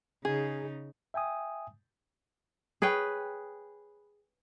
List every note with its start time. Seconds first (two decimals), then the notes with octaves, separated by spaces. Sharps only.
0.25 C#3 D#4 G#4
1.14 E5 G5 G#5 D#6
2.82 G#4 B4 C#5 G5